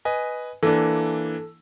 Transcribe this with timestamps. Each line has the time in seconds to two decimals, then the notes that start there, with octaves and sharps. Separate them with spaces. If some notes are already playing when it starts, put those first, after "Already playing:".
0.05 B4 D#5 G#5
0.63 E3 A#3 D4 A4